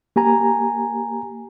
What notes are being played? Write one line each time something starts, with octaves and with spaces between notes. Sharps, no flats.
A#3 G4 G#5 A#5